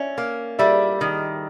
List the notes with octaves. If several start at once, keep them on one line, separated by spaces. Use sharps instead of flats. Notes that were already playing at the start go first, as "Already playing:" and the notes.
Already playing: C#4 D5 E5
A#3
G3 D5 E5
D#3